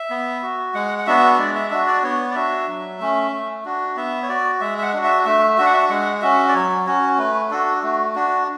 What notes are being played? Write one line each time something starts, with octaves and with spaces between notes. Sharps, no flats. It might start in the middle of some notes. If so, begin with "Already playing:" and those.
Already playing: E5
B3
F#4
G#3 F#5
F#5
B3 D4 F#4 E5
G#3 D5
E5
D4 F#4 E5
D5
B3 C#5
D5
D4 F#4 E5
F#3
A3 C#4
A3
D4 F#4
B3 E5
C#5
F#4 D5
G#3 E5
E5
F#5
D4 F#4
E5
A3 E5
D4 F#4 E5
F#5
E5
G#3 F#5
C#4 F#4 E5
D5
F#3 C#5
C#4 F#4 C#5
A3 B4
D4 F#4 A4
A3 F#4
D4 F#4